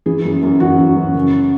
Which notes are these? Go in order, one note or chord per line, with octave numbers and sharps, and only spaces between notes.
E3 G#4
F#2
F#2
E3 F#4
E3
F#2
C#3